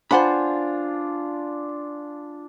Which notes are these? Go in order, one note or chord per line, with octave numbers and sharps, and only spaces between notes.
D4 F4 C5 F#5 G#5 B5